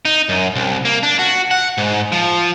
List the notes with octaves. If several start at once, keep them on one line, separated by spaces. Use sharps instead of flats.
D#4
F#2
C2
A#3
D4
F#4
F#5
G#2
F3